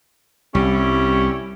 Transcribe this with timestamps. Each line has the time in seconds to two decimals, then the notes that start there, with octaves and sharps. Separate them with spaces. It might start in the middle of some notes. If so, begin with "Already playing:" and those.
0.55 C2 G3 C#4 E4